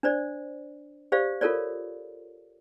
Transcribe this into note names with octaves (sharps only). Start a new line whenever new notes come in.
D4 C5 D5
G4 C5 D5 F5
F4 A4 A#4 C#5 D5